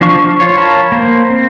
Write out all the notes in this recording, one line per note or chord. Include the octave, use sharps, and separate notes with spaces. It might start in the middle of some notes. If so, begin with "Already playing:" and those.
F3 D4 F5 C#6
F4 C#5
A#4 C#5 F5 A5 B5
A#3 C5
C4